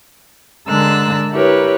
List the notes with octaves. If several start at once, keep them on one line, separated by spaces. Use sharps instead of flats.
D3 G#3 A#4 A5 E6 F#6
E4 G4 A#4 B4 C#5